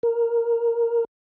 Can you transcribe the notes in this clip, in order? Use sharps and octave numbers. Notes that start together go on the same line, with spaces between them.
A#4